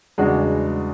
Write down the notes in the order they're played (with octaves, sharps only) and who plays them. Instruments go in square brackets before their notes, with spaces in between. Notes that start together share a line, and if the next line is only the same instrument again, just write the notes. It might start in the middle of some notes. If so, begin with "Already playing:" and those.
[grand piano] E2 C#3 G#3 D4 F#4